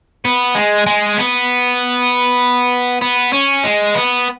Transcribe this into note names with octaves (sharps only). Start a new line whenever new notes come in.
B3
G#3
G#3
B3
B3
C#4
G#3
B3